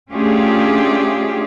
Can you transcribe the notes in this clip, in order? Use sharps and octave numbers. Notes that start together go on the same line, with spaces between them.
A3 C#4 D4 F4 G4 G#4